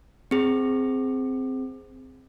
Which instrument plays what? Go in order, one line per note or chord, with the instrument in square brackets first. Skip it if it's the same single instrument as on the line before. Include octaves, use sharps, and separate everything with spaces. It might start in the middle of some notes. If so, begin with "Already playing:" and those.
[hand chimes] C4 G#4